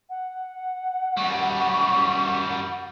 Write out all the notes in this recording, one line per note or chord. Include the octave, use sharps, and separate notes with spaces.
F#5
F#2 G3 C#6